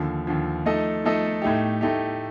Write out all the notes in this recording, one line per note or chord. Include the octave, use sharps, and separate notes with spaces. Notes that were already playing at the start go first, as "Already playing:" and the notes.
Already playing: D#2 D3 F3
D#2 D3 F3
F3 A3 D#4 A4 D#5
F3 A3 D#4 A4 D#5
A2 A3 D#4 G4
A2 A3 D#4 G4